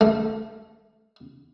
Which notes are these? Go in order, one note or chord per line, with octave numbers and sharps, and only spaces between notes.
A3